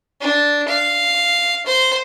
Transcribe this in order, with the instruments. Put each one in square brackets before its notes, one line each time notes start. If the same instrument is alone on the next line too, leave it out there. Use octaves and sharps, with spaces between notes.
[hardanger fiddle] D4
F5
C5